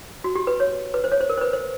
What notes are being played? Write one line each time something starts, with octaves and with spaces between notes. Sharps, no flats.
F#4
G4
B4
C#5
B4
C5
C#5
C5
A#4
C5
B4
C5